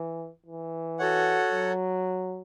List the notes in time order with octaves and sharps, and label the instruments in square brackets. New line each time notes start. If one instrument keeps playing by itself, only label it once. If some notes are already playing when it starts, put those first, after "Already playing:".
Already playing: [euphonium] E3
E3
[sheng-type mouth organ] F#4 A4 C#5 F#5
[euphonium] F#3